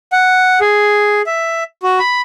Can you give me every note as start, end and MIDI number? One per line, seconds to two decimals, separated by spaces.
0.12 0.59 78
0.61 1.22 68
1.26 1.64 76
1.83 1.99 66
1.99 2.22 83